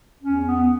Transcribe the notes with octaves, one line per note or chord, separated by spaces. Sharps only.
E2 C#4
B3